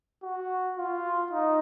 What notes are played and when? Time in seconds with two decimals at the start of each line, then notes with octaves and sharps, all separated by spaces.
0.23 F#4
0.77 F4
1.31 D#4